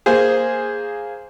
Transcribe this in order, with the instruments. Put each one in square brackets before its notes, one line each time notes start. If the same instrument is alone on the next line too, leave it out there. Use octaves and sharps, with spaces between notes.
[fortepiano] A#3 G#4 C5